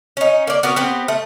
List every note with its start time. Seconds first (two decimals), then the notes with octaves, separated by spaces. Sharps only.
0.17 C#4 D#4
0.47 A#3 D5
0.63 B3 F#4 A#4
0.76 B3 C4 G4
1.08 A3